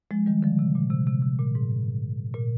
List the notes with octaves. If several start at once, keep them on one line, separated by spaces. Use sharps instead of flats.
F3 G#3
D#3 G3
D3 F3
C3
A#2
C3
C3
C3
A#2
G#2
A#2